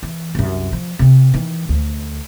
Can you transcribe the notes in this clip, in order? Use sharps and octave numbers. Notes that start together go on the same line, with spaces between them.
E3
C2 F#2
F3
C3 C4
D#3 E3
D2